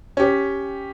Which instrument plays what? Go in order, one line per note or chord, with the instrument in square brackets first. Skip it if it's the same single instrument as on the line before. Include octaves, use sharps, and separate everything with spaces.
[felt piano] C#4 G4